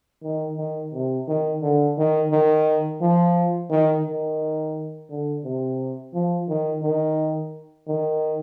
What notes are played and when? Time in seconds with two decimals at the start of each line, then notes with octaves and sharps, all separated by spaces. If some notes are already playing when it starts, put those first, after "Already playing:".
0.23 D#3
0.58 D#3
0.93 C3
1.28 D#3
1.62 D3
1.98 D#3
2.31 D#3
3.01 F3
3.71 D#3
4.05 D#3
5.10 D3
5.44 C3
6.13 F3
6.49 D#3
6.83 D#3
7.88 D#3